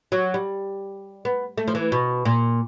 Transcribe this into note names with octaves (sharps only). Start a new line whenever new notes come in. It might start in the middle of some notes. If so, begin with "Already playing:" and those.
F#3
G3
B3
A3
F3
E3
B2
A#2